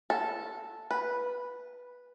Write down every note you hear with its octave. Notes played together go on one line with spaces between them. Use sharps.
A4
B4